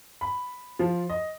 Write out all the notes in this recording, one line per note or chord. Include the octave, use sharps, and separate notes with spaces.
B5
F3
D#5